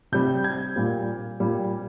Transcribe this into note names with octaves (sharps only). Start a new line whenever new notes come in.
C3 G3 G6
G#6
A#2 G3
A#2 G3